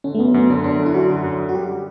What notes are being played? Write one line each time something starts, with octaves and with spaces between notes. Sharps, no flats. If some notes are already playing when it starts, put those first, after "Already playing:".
D3 C#4
A3
F#2 B3
F#2 B3
D3 C#4
F#2 D4
D3
E4
F#2 F#4
D3
F#2
F#2
F#4
G3 G4